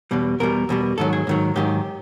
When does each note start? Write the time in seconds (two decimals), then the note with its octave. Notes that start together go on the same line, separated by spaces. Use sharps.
0.11 E2 B2 G3
0.40 E2 B2 G3 A#4
0.69 E2 B2 G3
0.98 G#2 D#3 F#3 A4
1.13 G#4
1.27 G#2 D#3 F#3
1.56 G#2 D#3 F#3 G4